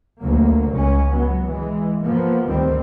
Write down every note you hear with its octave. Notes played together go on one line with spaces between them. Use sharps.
D2 F#3 A#3
C#2 C#4
F#3 B3
E3 G#3
F3 A#3 B3
D2 D#3 G3 C4